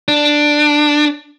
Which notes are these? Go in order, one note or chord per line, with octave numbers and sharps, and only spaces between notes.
D4